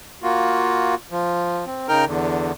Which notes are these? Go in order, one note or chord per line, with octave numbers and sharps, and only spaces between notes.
A#3 F4 F#4
F3
C4
C#3 D#4 A#4 G5 F6
E2 D3